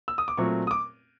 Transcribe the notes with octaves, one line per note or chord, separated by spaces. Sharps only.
E6
D#6
D6
A#2 F#3 A3 C4 C#6
D#6
D6